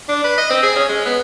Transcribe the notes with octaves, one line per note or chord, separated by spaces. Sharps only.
D4
B4
D#5
C4
G#4
C#4
G#3
B3